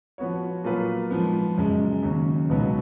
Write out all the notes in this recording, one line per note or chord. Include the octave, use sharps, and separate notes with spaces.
F3 B3 F#4 C#5
A#2 F#3 A#3 F4 B4
G#2 F3 B3
F#2 C#3 G#3
D#2 C#3 F#3
C#2 B2 F#3 B3 D#4